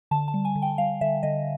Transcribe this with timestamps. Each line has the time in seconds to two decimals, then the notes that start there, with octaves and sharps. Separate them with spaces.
0.11 D3 A5
0.28 A5
0.34 G3
0.45 G#5
0.55 D3
0.62 G5
0.78 G3 F5
1.01 D3 E5
1.23 D3 D#5